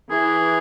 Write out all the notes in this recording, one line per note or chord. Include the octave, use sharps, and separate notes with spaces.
E3 G#4